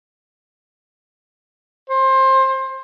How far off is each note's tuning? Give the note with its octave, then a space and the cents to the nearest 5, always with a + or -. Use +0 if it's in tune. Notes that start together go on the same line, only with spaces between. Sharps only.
C5 +25